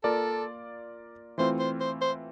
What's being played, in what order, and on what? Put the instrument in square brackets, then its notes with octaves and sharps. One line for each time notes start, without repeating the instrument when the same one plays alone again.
[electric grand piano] A#3 F4 A#4 D5 [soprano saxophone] A4
[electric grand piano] E3 A3 C4 F4 [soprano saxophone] C5
[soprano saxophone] C5
C5
C5